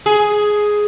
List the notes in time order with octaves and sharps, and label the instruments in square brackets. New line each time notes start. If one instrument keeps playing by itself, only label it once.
[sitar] G#4